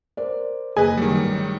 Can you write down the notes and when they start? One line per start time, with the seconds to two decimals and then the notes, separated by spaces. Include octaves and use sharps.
0.17 A#4 C5 D5
0.77 F#1 G#4 B4 D#5 G#5
0.97 D#3 F#3 G3
1.22 A1